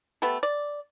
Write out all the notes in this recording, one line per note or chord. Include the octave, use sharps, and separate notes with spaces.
A3 B3 G4 A4
D5